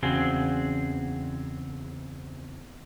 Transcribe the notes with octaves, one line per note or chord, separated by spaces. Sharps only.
E2 C#3 C4 F#4 G#4